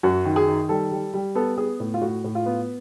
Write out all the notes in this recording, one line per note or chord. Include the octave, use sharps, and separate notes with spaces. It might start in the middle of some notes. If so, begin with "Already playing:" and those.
F#2 F#4
D#3
G#4
D#3
G3 A4
G3
G3
B3 A4
B3 G#4
A2
F4
A2 F#4
A2
F4
B3